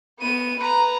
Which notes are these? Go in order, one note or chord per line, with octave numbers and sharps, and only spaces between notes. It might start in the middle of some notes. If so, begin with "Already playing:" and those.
B3 D#7
B4 A#5